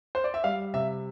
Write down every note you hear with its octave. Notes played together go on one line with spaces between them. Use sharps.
C5
D5
E5
G3 F5
C3 E5